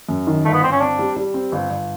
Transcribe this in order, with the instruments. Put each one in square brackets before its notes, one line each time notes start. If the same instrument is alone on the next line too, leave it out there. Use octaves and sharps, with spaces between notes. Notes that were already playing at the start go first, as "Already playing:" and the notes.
[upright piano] F#2
D#3
[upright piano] G1 [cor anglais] A3
[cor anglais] B3
[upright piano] G1 [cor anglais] C4
[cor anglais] C#4
[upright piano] C4 [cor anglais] D4
[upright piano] G3
G3
C4
G1
G1